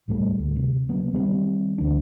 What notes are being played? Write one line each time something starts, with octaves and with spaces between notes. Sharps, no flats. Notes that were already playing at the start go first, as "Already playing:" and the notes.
C2 A2 G3 A3
D2
C3
C#3 F#3 A#3 B3
D#3 G3 A#3 C4
D2 E3 D4